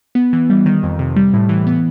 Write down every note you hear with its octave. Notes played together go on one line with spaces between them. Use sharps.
B3
E3
G3
D#3
F2
C3
G3
A2
E3
B3